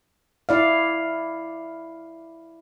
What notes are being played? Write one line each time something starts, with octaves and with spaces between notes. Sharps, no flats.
E4 D5 F5